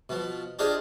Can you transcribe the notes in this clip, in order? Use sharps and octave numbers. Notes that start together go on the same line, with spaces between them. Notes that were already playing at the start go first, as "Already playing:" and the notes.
B2 F3
D4 F4 G4 G#4 C5 D#5